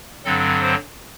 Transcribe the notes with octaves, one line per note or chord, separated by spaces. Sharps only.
G2 D3 F#3 C4 A4
C5